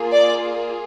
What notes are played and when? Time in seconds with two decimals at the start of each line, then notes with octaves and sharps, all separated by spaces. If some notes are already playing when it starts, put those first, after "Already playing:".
Already playing: A#3 F4 G#4
0.12 D5